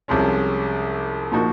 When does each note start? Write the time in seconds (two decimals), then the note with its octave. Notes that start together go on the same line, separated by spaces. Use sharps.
0.08 C2 C3 F3 G#3 C#4
1.32 A#2 F3 A#3 D#4 F#4